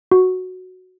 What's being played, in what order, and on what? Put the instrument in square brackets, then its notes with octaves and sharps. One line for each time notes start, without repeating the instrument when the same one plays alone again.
[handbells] F#4